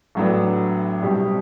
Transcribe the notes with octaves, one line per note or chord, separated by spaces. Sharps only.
A1 A2 F#3 B3 D4
B2 G3 C4 E4 G4